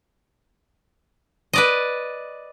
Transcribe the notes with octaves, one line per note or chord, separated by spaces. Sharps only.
B4 D5 D#5